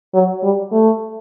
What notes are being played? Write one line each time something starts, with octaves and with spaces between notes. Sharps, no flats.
F#3
G3
A3